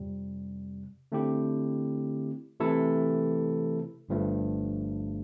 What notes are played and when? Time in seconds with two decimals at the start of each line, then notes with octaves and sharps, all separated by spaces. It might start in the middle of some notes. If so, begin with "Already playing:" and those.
Already playing: F2 C3 G3
1.12 D3 A3 C4 E4 G4
2.60 C3 E3 A3 E4 A4
4.09 G1 G2 F3 A3